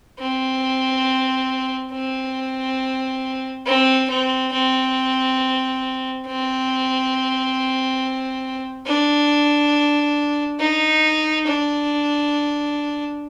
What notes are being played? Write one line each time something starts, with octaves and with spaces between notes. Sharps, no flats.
C4
C4
C4
C4
C4
C4
D4
D#4
D4